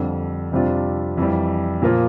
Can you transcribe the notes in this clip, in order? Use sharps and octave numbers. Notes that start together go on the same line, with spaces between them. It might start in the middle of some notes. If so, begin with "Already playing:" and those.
Already playing: F2 D3 G3
F2 C3 G3 D4 F4
F2 E3 G3
A#2 F3 A#3 F4